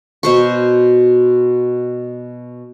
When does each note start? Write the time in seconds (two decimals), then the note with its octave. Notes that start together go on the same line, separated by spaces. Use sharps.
0.23 B2 C5 C#6